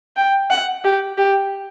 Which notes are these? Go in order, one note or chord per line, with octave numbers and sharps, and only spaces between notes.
G5
F#5
G4
G4